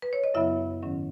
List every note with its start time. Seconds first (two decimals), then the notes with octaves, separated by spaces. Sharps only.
0.02 B4
0.13 C#5
0.24 D#5
0.34 F#2 C#3 F#3 B3 E4 E5
0.82 G#2 D#3 F#3 C#4